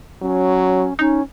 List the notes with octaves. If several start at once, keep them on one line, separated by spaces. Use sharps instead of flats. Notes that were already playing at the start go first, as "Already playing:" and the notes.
F#3 C#4
C#4 D#4